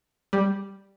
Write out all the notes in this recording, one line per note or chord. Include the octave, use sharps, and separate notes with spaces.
G3